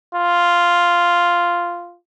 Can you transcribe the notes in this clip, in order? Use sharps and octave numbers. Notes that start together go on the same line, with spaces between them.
F4